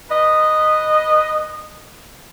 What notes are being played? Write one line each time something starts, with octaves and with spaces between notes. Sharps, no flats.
B4 D#5